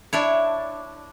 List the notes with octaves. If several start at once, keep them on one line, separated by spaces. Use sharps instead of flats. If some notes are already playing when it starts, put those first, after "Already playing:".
D4 E4 C#5